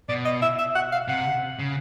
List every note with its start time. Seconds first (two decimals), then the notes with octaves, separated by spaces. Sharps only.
0.09 B2 D5
0.25 D#5
0.42 E5
0.59 E5
0.75 F#5
0.92 F5
1.08 C3 F#5
1.59 C#3